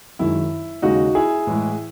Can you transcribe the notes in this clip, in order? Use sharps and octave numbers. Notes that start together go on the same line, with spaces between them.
F#2 D#3 G#3 E4
D#2 C#3 G#3 D#4 F#4
E4 G#4
A2 E3 G#3